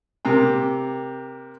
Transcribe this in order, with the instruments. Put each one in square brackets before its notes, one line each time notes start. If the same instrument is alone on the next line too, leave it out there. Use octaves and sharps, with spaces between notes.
[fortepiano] C3 A#3 G5